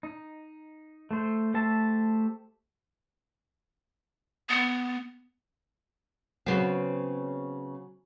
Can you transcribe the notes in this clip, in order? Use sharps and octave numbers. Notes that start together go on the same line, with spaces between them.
D#4
A3 C5
A3 G4 C5 E5 A5
B3
C#3 F#3 B3 C4